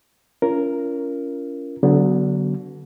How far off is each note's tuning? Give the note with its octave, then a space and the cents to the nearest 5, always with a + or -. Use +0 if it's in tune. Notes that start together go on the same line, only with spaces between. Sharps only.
C#4 +20 F4 -40 A#4 +0
D3 -25 F#3 +20 B3 +0